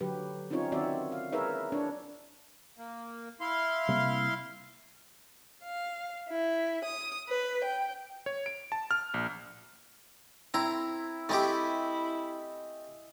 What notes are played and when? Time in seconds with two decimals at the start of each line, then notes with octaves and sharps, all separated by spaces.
0.01 D3 F#3 G4 B4
0.50 C4 C#4 D#4 F4 C#5
0.72 D#3 C4 F#4 C#5 D5 E5
1.12 F5
1.32 E4 G#4 A#4 B4 C#5 E5
1.72 D4 E4 C#5
2.78 A#3
3.41 E4 F5 C6
3.88 C3 G3 A#3
5.61 F5
6.27 E4
6.83 D#6
7.27 B4
7.62 G5
8.26 C#5
8.46 D7
8.72 A5
8.91 F6
9.14 A#1
10.54 C4 E4 A#5
11.29 A3 C4 E4 G4 D#5 G#5